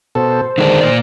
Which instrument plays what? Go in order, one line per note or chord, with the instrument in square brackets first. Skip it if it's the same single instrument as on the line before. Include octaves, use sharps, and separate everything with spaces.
[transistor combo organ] B2 A4 [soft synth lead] C5
[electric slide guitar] D3 G#3 D4 [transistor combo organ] D#3
[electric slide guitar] A#2 D5